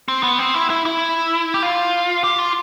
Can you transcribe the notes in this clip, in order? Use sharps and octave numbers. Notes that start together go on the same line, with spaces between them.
C4
B3
C4
E4
E4
E4
G4
F4
G4
F4